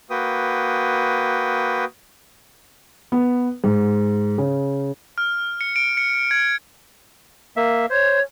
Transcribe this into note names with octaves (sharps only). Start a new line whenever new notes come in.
A#3 F#4 B4 G5 D#6
B3
G#2
C#3
F6
C#7
D7
C#7
G#6
A#3 E5
C5 C#5 G#6